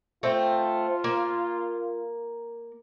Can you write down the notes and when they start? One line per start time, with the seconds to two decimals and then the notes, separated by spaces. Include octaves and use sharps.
0.23 A3 C4 F4 G5
1.04 A#3